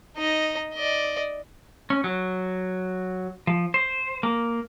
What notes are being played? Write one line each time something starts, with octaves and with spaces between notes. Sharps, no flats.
D#4 D#5
D5 D#5
C#4
F#3
F3
C5
A#3